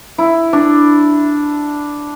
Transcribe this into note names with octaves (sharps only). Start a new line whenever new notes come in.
E4
D4